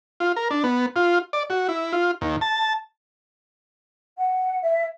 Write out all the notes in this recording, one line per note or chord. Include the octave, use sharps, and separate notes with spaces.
F4
A#4
D4
B3
F4
D5
F#4
E4
F4
D#2
A5
F#5
E5